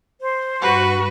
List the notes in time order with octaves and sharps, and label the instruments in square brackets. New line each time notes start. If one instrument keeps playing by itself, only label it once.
[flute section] C5
[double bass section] G2 [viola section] F#4 [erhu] B4